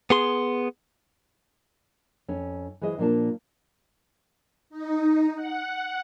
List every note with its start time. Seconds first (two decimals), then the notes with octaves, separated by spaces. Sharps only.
0.10 B3 G#4 C6
2.28 F2 C#4
2.81 E3 G#3 G#4 C5 D#5
2.98 A#2 F3 A#3 D4 C5 A5
4.70 D#4
5.35 F#5